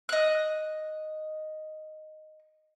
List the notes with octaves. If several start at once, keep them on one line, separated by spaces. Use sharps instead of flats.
D#5 F#6